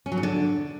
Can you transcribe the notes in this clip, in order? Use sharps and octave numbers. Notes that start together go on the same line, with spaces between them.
C#4
F#3
G#2
D3